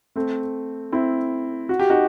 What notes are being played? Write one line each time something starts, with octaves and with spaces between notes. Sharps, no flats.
A3 C4
C4 E4
F#4
G4
D#4 F#4